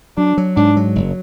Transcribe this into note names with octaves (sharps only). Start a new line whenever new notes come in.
F#3 D4
F#3
G#2 D4
F#3
F#1